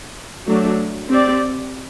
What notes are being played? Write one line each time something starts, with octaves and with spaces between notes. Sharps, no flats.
F#3 A3 D4
C4 G4 D5